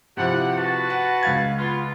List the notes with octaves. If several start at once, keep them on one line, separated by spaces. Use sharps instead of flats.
C3 F3 E4 G4 F#5
F#4 B4 A5
F#5
C#2 F5 G#6
B3 F4